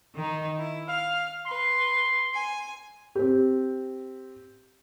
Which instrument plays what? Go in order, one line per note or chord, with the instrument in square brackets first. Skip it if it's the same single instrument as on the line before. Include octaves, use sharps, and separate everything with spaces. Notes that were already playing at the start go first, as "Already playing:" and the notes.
[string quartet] D#3 D#4
E4
[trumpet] F5 [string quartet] F6
[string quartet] B4 [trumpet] C6
[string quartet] G#5
[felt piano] C4 G4